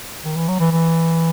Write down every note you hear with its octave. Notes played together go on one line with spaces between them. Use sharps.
D#3
E3
F#3
E3
E3